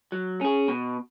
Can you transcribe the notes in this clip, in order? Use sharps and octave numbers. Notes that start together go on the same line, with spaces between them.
F#3
C#4 G#4
B2